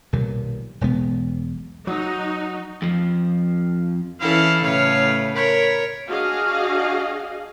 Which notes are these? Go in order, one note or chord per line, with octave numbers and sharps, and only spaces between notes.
B1 A#2 D#3 G3
E1 B1 G#3 B3
F#3 D#4 F#4
F2 F3
E3 C#4 E4 A4 F5
A2 C#3 A3 B4 C#5 F5
A#4 C#5 B5
D4 F#4 G#4 D#5 F5